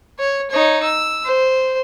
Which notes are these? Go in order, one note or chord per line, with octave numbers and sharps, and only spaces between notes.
C#5
D#4 C#5
E6
C5